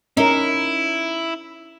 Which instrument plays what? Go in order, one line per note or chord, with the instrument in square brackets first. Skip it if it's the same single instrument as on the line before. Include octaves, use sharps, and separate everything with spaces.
[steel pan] C#4 A#4 [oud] D#4 [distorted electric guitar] E4